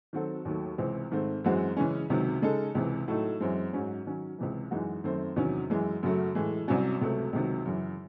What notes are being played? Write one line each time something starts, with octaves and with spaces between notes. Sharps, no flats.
D#3 F#3 C4 F#4 A4
D#2 D#3 F#3 A3
C#2 C3 E3 C4
G#2 D#3 A3 C4
F#2 E3 G#3 C4 F#4
C#3 E3 G#3 C#4
C#2 C3 D#3 F#3
C#3 G#3 D#4 A4
C#2 C3 E3
A2 F#3 A3 D#4
F#2 E3 G#3 C4
G#2 F#3 C#4
D#3 F#3 C#4
C#2 C3 E3
F#2 E3 G#3 D#4 F#4
F#2 D#3 A3 C4
E2 C3 D#3 F#3 C#4
F#2 E3 G#3
F#2 C#3 F#3 A3
A2 E3 G#3
C2 C3 F#3 C#4
C#2 C3 F#3 A3
C#2 C3 D#3 F#3
F#2 C#3 E3